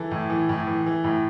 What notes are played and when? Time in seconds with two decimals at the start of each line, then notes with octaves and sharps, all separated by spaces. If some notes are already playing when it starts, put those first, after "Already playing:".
Already playing: E3 A4
0.11 A2
0.30 E3
0.49 A2
0.67 E3
0.86 E3
1.04 A2